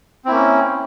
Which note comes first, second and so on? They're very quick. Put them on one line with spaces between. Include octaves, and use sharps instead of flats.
C4 E4 A#3 C#4